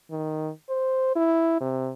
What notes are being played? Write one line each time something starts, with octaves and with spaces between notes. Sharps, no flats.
D#3
C5
E4
C3